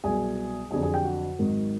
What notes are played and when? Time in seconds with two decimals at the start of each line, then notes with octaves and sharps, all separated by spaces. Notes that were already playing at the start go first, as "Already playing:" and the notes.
0.04 C2 B2 F#3 G#4 G#5
0.71 F2 D3 F#3 G#4 G#5
0.83 G#4 G#5
0.94 G4 G5
1.05 F#4 F#5
1.39 G#1 G#2 D#3 F#3